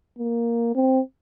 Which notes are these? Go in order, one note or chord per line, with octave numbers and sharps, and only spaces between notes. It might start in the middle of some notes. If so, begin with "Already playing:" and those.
A#3
C4